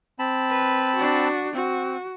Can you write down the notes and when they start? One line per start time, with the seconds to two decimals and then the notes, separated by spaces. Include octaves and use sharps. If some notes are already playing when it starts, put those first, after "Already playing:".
0.19 C4 A5 B5
0.51 B4
0.96 D4 F#4
1.54 C4 F#4